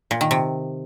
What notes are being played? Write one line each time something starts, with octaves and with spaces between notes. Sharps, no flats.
A#2
D#3
C3